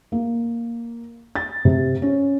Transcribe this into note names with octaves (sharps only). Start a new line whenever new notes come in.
A#3
A6
C3
C#4